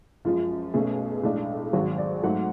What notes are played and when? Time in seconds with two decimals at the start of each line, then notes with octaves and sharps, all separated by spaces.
0.25 F#2 F3 G#3 F4
0.74 B1 B2 A3 C#4 G#4
1.23 B1 A2 G#3 D4
1.73 G#1 G#2 F#3 F#4
1.98 D5
2.23 G#2 F#3 A3 F#5